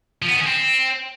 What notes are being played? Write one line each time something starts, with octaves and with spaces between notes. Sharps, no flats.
F3
B3
D#3
C#4
C4